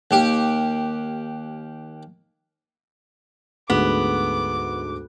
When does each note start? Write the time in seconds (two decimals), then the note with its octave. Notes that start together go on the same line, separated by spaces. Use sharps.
0.11 D#2 G4
3.70 D2 G#2 G#3 B3 D6